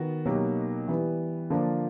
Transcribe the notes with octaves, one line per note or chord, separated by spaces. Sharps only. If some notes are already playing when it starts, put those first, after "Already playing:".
Already playing: D#3 B3 F#4
B2 F#3 A#3 D#4 G4
E3 G3 B3
D3 F3 A#3 D4 F4